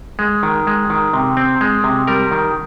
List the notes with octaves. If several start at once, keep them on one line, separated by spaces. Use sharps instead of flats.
G#3
D#3
G#3
D#3
C3
C4
G#3
C3
G3 A#4
D#3